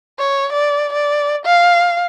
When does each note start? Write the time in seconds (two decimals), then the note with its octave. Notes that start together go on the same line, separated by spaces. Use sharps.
0.18 C#5
0.52 D5
0.93 D5
1.46 F5